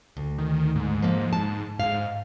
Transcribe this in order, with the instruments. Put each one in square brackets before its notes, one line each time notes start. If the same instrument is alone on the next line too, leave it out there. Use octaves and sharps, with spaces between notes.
[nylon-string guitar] D2
[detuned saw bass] D#3
G#2
[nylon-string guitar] F3 A#3
A5
[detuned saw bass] G#2 [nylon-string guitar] F5